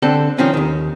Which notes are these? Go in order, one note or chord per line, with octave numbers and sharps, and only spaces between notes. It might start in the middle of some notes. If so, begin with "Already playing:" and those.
D3 C4 A4
D#3 F3 C4 C#4
D#2 D#3